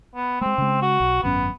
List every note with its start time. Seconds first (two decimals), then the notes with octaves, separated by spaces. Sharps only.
0.15 B3
0.41 G#3 A3 C4
0.58 C#3 G#3
0.82 F#4
1.00 B1
1.23 G#1 F#2 B3 C#4